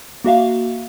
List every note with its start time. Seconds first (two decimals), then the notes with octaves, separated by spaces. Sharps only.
0.24 A#3 F#4 E5 F5